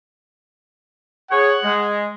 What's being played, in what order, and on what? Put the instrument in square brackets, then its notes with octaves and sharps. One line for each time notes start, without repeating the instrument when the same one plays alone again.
[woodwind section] G#4 C#5 [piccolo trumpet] F#5
[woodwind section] G#3